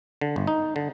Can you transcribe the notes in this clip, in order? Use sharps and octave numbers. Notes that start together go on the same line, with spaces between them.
D3
G1
D#4
D3